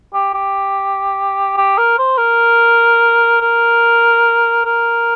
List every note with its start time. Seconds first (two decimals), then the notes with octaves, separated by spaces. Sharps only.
0.13 G4
0.34 G4
1.57 G4
1.78 A#4
1.98 C5
2.18 A#4
3.41 A#4
4.65 A#4